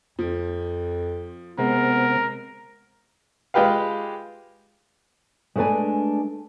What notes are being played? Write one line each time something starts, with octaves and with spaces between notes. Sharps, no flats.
F2 F3
C3 G#3 B3 C4 A#4
G#3 F4 G4 B4 F5
G#3 A3 D4 B4 D5 G#5